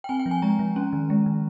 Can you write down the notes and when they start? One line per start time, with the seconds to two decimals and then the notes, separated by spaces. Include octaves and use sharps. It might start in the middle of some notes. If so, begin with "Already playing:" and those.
0.04 G5
0.09 C4 G#5
0.19 G5
0.26 F3
0.31 G#5
0.42 G#3 A#5
0.59 F3
0.76 C#4
0.93 D#3
1.10 G#3
1.26 D#3